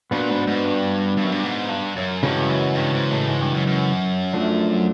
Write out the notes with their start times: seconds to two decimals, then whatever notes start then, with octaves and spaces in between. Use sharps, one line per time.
0.11 A#2 B3 D4 F#4 B4
0.30 G#2
0.47 G#2
0.65 G2
1.17 G2
1.24 F#2
1.32 G2
1.44 G#2
1.69 G2
1.96 F#2
2.23 G2 C#3 E3 G#3 C#4 F#4
2.49 F#2
2.75 G2
2.93 G#2
3.11 A2
3.28 G#2
3.41 G2
3.54 F#2
3.67 F#2
4.33 F3 A3 D4